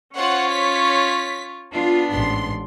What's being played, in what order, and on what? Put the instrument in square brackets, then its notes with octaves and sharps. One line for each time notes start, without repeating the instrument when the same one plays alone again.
[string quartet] C#4 F4 C#5 [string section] C5 F#5
[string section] B6
[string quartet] B3 D4 [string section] F4
[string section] A1 G#2 C6